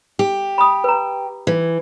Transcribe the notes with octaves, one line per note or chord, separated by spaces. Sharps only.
G4
B5 D#6
B4 A#5
E3